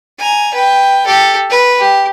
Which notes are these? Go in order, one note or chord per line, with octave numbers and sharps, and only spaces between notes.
G#5 A#5
B4 G5
G4 A4
B4
G4